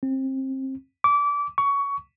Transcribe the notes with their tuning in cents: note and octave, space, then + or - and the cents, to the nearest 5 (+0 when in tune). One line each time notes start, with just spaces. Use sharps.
C4 +25
D6 -25
C#6 +20